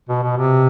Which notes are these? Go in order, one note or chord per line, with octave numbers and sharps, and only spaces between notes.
B2
B2
C3